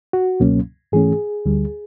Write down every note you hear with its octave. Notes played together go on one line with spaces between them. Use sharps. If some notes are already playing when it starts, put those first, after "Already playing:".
F#4
C#2 B2 F#3 A#3 C#4
G#2 E3 A3 C#4 G#4
D2 D3 G3